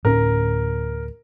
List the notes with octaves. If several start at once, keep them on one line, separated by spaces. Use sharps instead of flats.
D2 A2 C#4 A#4